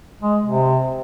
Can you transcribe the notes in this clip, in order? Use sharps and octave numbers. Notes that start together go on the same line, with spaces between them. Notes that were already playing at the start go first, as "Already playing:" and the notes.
G#3
C3